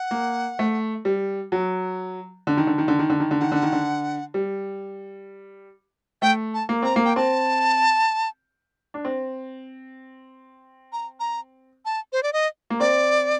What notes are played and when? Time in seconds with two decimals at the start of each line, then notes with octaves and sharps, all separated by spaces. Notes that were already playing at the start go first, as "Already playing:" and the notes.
Already playing: F#5
0.11 A#3
0.59 A3
1.05 G3
1.52 F#3
2.47 D3
2.57 D#3
2.67 D3
2.78 D#3
2.88 D3
2.99 D#3
3.10 D3
3.20 D#3
3.31 D3
3.40 D#3 F#5
3.52 D3
3.63 D#3
3.73 D3
4.34 G3
6.22 A3 G5
6.54 A5
6.69 A#3
6.82 C4 A#5
6.96 A#3
7.05 G5
7.16 C4 A5
8.94 D4
9.05 C4
10.93 A#5
11.20 A#5
11.85 A5
12.13 C5
12.23 D5
12.33 D#5
12.70 A#3
12.80 C4 D5